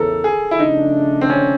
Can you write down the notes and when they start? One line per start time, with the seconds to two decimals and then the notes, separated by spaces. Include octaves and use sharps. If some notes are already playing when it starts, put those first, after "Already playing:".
Already playing: E2 C#3 E3 A4 A#4
0.24 G#4
0.51 E4
0.59 C#3 F3 A3 D4 D#4
1.21 C4
1.30 C#4